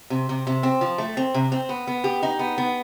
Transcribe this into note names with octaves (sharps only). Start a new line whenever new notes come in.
C3
C3
C3
C4
F3
A3
C4
C3
C4
B3
B3
G4
D#4
B3
B3